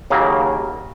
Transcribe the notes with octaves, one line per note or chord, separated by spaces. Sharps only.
D#2 C#3 F#3 A#3